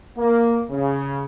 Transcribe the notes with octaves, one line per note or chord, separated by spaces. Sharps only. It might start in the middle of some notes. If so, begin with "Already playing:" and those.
A#3
C#3